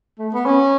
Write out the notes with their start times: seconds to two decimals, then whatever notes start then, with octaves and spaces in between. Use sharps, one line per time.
0.19 A3
0.33 B3
0.46 C#4